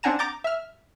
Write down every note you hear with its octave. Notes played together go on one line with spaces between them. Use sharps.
C4 D4 F#5 G#5 A#5 E7
A#5 D6 G6 A6
E5 F6